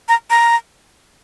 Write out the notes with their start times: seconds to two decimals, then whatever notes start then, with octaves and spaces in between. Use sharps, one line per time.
0.09 A#5
0.30 A#5